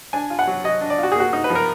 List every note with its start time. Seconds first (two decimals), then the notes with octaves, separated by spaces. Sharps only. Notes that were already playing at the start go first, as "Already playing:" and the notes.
0.13 D4 G#5
0.30 F4
0.39 F#5
0.47 F#3
0.64 F#3 D#5
0.81 D4
0.90 D5
0.99 F4 F#4
1.12 G#4
1.16 A#3 F#4
1.33 D#4
1.44 B4
1.50 F3
1.55 A#4